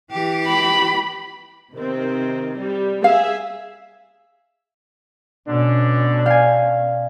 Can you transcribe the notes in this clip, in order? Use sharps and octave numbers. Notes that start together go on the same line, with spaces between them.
E3 G4
B5
C3 D#3 C4
G3
G#4 E5 F5
B2 D3 C#4 D4
D5 F5 G#5